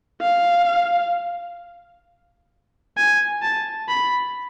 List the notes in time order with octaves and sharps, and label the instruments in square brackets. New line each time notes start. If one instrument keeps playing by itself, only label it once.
[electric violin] F5
G#5
A5
B5